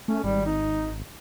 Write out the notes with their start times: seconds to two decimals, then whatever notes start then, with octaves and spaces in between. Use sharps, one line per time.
0.08 A3 C#4
0.24 G#1 G3
0.46 D#4